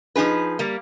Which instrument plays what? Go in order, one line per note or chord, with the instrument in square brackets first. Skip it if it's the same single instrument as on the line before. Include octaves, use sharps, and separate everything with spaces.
[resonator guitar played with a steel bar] F3 D#4 G#4 B4
G3 A#3